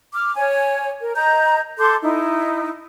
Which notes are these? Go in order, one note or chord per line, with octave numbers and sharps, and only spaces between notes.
D6 F6
C#5 G#5
A#4
D#5 A#5 G6
A4 C6 D6 G6
D#4 E4